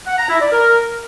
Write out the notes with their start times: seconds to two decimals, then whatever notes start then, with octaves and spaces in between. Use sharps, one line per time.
0.07 F#5
0.18 A#5
0.29 E4
0.40 D5
0.52 A#4